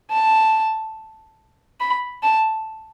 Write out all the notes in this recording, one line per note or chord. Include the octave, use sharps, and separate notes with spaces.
A5
B5
A5